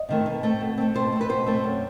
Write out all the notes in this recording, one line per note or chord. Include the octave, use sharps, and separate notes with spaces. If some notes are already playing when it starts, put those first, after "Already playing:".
Already playing: D#5
C3 D#3 A3
B2
A3 C4
B2
A3 C4
B2 C5
A3 C4
B4
B2 C5
A3 C4
F#2